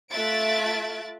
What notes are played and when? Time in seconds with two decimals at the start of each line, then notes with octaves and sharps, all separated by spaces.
0.11 A3 F4 E5 F#6 A6 D7